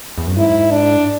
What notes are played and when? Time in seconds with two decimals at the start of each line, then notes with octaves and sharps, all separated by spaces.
0.18 E2
0.27 F#2
0.37 G#2 E4
0.71 D4